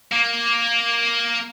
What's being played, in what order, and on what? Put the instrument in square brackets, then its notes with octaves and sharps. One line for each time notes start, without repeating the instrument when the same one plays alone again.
[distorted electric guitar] A#3